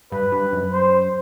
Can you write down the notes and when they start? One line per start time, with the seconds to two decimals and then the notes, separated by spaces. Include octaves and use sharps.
0.12 G2 B4
0.32 G2
0.52 F#2
0.72 C5